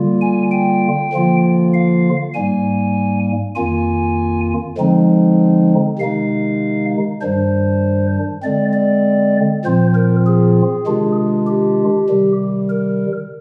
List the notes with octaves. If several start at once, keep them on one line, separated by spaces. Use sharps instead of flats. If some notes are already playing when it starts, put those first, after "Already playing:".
Already playing: D3 G3 A#3 F4
G#5
G5
D3 F3 A#3 F4
F5
G#2 G3 A#3 G#5
F2 D#3 A#3 F4 G#5
D3 F3 G#3 C4 D#4
C3 D#3 G#3 D#4 F5
G2 D#3 G3 D4 C5
D3 G#3 C4 D5
D5
A#2 F3 C4 F4 C5
A#4
G#4
C3 D#3 G#3 D4 F4
G4
C3 D#3 G3
A#4